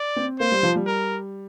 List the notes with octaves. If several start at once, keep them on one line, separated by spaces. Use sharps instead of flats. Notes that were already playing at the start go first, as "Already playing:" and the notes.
Already playing: D5
C4
A#3 C5
G3
F3
G3
A#4